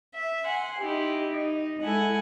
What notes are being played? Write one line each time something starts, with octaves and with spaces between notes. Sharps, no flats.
E5
F#5 G#5 C6
D#4 E4 G4
D#4
G#3 E4 A4 F#5 G#5